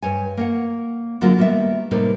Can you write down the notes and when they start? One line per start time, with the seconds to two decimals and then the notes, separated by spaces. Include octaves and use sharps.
0.02 G2 C#5 G#5
0.38 A#3 C#5 F#5
1.21 D3 F#3 G#3 A#3 C4 F4
1.38 D#3 G3 A#3 B3 E5
1.91 A2 C3 G3 A#3 D#4 B4